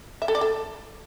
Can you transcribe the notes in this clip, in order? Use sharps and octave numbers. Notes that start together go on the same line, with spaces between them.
E5
A4
D5
A4